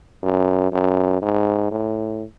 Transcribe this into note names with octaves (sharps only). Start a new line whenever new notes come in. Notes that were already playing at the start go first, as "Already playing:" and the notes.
F#2
F#2
G#2
A2